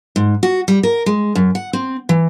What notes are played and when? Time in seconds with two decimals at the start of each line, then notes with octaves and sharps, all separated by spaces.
0.16 G#2
0.43 F#4
0.68 G3
0.83 A#4
1.06 G#3
1.35 F#2
1.55 F#5
1.73 C4
2.09 E3